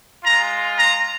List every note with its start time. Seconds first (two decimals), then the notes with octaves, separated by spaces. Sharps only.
0.24 G#3 F4 A#5
0.78 A#5